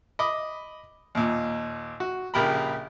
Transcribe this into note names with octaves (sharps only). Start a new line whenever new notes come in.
D#5 B5 D6
D#2 A#2
F#4
A#1 C#3 G4 A#4 A#5 B5